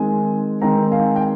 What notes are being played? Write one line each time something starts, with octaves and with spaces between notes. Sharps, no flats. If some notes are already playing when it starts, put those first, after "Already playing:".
Already playing: D#3 G#3 C4 G#5
D#3 G#3 C4 G5 A#5
F5 G#5
G5